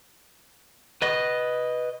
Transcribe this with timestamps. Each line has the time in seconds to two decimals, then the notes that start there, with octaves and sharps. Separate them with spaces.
1.02 B4 D#5